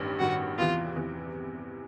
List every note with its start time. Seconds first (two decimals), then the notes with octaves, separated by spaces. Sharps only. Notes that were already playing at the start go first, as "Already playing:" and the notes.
Already playing: A1 G2 D#3
0.19 A1 G2 D#3 F#4
0.58 E2 C3 E3 F4
0.96 E2 C3 E3